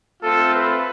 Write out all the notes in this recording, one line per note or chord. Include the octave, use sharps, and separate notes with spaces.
A3 C4 F4 A4
B4